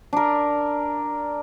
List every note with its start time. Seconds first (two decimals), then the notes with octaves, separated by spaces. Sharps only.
0.13 D4 A#4